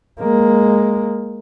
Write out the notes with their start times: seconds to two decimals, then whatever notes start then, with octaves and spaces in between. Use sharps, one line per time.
0.20 G#3 A#3